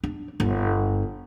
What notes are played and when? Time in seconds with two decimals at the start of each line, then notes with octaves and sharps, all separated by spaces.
0.04 D4
0.40 G1